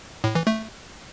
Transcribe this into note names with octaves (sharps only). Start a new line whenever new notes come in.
A2
E3
A3